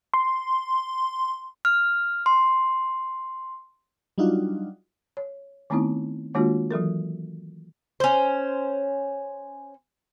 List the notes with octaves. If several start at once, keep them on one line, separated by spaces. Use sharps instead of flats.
C6
F6
C6
F#3 G3 D4 D#4 F4 F#4
C#5
D#3 A3 B3 C4 D#4 E4
D#3 G#3 A#3 D4 F4 F#4
E3 F#3 A4 A#4
C#4 C5